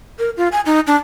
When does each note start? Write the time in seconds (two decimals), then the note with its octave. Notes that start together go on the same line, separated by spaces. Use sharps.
0.19 A#4
0.37 F4
0.52 G#5
0.66 D#4
0.87 D4